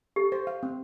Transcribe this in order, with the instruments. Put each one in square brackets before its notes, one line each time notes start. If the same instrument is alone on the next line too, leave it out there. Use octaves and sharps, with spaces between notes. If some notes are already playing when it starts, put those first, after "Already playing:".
[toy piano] G4 [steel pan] A4
[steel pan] C5
F5
C4